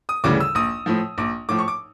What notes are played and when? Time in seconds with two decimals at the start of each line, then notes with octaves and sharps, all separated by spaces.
0.09 D#6
0.24 D2 C#3 E3 G3 D6
0.40 E6
0.55 A#1 D#6
0.86 A2 F3
1.18 A#1 D6
1.49 A2 F3 D6
1.58 C#6
1.68 D6